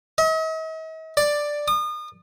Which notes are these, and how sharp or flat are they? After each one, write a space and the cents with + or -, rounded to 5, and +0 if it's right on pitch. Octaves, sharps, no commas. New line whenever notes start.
D#5 +45
D5 +5
D#6 -35